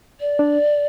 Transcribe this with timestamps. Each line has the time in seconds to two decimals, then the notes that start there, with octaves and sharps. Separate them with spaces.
0.20 D5
0.39 D4